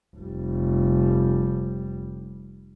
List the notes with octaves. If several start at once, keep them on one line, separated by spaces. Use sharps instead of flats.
F1 G3